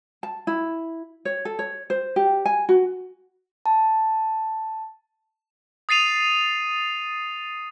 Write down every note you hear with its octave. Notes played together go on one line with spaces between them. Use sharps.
A5
E4
C#5
A4
C#5
C5
G4
G#5
F#4
A5
D#6 A6 C7 D#7 F7